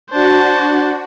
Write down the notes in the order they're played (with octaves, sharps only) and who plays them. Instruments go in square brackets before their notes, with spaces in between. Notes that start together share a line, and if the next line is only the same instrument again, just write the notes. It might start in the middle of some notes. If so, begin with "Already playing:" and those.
[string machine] D4 F#4 [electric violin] C5 A5